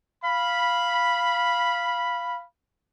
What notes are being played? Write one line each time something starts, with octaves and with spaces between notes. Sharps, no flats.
F5 B5